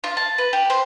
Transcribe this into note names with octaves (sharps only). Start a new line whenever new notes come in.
F4
A5
B4
G4
C5